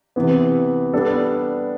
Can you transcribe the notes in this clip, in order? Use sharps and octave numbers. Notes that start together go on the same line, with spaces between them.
C3 E3 B3
G3 B3 D4 A4